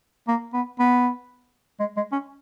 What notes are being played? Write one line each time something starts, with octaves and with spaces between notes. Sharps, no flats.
A#3
B3
B3
G#3
G#3
C#4